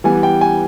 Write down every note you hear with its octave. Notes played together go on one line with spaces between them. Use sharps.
E3 G3 B3 G#5
G5
G#5